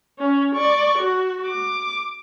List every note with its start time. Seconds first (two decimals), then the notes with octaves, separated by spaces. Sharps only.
0.19 C#4
0.55 D5 C#6
0.98 F#4
1.46 D6